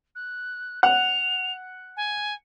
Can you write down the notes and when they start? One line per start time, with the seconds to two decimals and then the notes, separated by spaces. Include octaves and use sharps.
0.15 F#6
0.83 F#5 F7
1.96 G#5